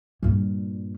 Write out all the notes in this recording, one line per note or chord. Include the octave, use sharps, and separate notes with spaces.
G2 A#2